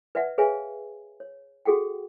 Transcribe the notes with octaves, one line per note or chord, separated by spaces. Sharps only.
B4 D5 E5 F#5
G#4 B4 C#5 E5 F5 G#5
C#5
F#4 G#4 A4 F#5 G5